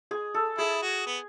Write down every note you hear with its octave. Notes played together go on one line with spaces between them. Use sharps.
G#4
A4
E4 G#4
F#4
B3